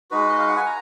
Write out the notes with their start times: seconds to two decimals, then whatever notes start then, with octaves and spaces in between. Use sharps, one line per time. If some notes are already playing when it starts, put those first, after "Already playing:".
0.11 G#3 D#4 F#4 B4
0.29 D#5
0.38 F5
0.47 F#5
0.57 G#5
0.66 A#5